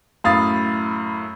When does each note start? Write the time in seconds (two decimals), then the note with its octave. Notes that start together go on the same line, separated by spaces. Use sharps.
0.24 F#2 A2 F5 B5 D#6 A6